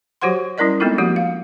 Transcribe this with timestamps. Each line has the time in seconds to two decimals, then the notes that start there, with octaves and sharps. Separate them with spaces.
0.22 F#3 F#4 G4 C5 F#5 C6
0.58 G3 C#4 E4 A#4 D5 D#5
0.80 G#3 B3 C4 D#4 F4 A4
0.98 F3 A#3 F#4 G4
1.16 F5